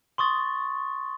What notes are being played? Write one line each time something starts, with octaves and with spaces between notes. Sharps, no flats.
C6 C#6 D#6 A6